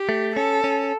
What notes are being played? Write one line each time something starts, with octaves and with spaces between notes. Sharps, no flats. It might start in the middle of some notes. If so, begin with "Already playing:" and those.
Already playing: G4
A3
C#4 A4
C#4